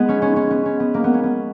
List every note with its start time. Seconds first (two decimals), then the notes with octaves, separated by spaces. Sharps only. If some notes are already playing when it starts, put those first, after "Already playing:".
Already playing: G#3 B3
0.09 C#4
0.22 C#4
0.36 C#4
0.51 B3
0.66 C#4
0.80 B3
0.94 A#3
1.04 B3
1.14 C#4
1.23 B3